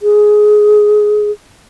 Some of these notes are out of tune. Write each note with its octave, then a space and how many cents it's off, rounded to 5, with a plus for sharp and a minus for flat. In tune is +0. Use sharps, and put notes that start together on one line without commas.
G#4 +15